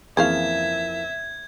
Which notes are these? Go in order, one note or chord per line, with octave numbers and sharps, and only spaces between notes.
F2 C#3 E3 F3 A#3 E5 F5 G#6